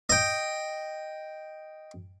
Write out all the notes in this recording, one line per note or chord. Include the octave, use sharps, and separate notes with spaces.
D#5 G5